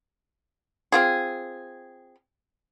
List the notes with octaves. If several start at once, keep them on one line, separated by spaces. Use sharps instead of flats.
C4 F4 G#4